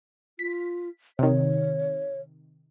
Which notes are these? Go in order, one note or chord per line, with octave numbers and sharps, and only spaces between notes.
F4 B6
C3 D#3 C#5